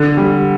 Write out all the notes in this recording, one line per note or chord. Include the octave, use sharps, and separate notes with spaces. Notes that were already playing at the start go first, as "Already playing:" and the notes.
Already playing: D3
G3